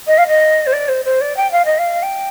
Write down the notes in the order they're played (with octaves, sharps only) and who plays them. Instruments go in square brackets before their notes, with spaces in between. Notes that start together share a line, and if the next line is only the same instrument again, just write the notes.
[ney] D#5
F5
D#5
C5
D5
C5
C5
D5
G5
F5
D#5
F5
G5